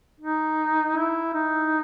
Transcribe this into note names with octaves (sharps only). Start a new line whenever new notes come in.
D#4
E4
D#4